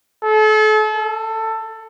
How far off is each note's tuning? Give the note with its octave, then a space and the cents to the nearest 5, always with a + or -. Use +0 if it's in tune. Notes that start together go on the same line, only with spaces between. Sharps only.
A4 -35
A4 +15